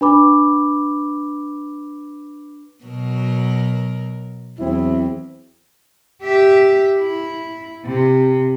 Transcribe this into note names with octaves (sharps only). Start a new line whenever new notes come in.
D4 B4 B5 D6
B2 F#3 A#4
E2 F#3 C4 E4
G4 E5
E4
C3